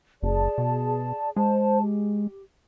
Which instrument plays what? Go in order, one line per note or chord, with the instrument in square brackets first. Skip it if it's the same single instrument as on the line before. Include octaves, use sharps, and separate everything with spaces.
[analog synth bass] F#1 [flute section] G#4 D5 A5
[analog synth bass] B2
[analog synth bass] G#3 [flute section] C5 A5
[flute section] G4